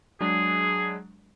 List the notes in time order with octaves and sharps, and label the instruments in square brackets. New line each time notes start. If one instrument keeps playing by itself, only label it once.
[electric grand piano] F#3 G#3 D4 [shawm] G#4